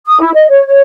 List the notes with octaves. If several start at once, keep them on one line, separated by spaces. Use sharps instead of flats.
D#6
E4
D#5
C#5
C#5